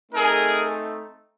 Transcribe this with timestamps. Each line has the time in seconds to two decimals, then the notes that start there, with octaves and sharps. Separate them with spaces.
0.12 A3 C4 D#4 G#4 A#4